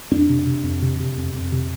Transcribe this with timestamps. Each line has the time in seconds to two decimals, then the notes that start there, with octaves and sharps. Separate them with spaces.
0.11 F2 D4
0.29 C3
0.46 C3
0.64 F2
0.82 C3
1.00 C3
1.17 F2
1.34 F2
1.52 C3